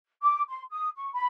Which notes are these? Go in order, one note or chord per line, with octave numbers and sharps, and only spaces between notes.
D6
C6
D#6
C#6
B5